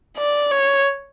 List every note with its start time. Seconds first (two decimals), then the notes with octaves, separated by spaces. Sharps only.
0.18 D5
0.52 C#5